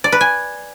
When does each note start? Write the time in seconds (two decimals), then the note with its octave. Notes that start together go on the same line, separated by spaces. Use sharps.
0.04 D5
0.12 B4
0.21 G#5